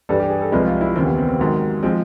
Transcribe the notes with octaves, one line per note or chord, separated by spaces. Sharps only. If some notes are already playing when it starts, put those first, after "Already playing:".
G2 E3 G3 A4
G4
G#4
A4
C2 C3 F3 G#3 B4
F4
E4
D#2 C#3 E3 C4
B3
C4
C4
G#2 D#3 F#3
F3 G#3 C4